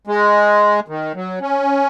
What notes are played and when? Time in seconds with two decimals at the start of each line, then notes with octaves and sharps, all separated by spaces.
0.07 G#3
0.88 D#3
1.15 F#3
1.41 C#4